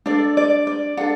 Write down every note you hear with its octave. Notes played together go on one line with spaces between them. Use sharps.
D4 A4 D5
D5
D5
D4 A4 F#5